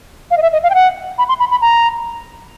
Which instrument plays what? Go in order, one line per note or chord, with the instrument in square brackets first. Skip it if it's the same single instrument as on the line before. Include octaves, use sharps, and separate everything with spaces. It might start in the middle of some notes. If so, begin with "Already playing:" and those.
[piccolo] F5
D#5
E5
D#5
F5
G5
F#5
B5
C6
B5
B5
A#5